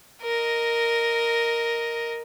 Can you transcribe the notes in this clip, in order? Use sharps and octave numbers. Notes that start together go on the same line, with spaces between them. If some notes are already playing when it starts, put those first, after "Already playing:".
A#4 D#5